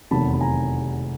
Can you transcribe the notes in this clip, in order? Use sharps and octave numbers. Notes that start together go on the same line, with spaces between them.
F1 E2 C3 D#3 F#3 A5 B5
B5
G#5 A#5